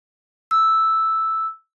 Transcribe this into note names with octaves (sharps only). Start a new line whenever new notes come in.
E6